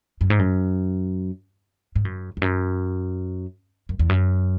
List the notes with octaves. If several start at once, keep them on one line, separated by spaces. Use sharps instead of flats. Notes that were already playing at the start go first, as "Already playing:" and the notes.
F#2
G#2
F#2
G#2
F#2
E2
F#2
F#2
E2
F#2